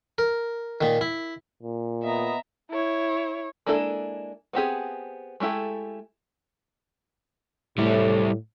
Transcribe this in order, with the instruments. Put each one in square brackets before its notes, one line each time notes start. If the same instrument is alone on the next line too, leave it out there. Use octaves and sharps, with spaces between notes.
[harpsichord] A#4
A#2 D#3
E4
[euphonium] A#2
[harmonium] B3 D#5 [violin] E5 A#5
[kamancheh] E4 C#5
[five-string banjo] G#3 A#3 D4 E4 A4
B3 C4 G4 G#4
G#3 A3 E4 G4 A4
[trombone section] A2 [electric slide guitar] G3 E4